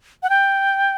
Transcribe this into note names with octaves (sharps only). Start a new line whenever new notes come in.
F#5
G5